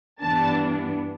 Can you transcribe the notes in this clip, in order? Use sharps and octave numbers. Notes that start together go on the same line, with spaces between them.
G2 E3 B3 D4 A5